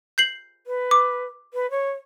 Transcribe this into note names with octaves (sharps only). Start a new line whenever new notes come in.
G6 C7 F#7
B4
D6
B4
C#5